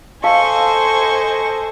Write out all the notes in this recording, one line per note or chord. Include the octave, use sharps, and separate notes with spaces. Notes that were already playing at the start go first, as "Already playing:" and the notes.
A4 C5 D#5 F5 G#5 C#6